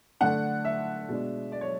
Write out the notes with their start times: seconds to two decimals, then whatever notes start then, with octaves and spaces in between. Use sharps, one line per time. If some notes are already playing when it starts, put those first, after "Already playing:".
0.20 D3 A3 D4 F#5
0.65 E5
1.09 B2 G#3 D4
1.52 D5
1.61 C#5